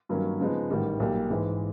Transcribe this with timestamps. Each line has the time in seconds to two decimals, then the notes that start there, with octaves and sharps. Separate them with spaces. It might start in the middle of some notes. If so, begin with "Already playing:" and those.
0.09 G2 D#3 F#3 A#3 C#4
0.40 C#3 F3 G#3 B3 D#4
0.70 A1 G#2 D#3 G3
1.00 B1 A#2 G3 A#3
1.30 G#1 G#2 E3 G#3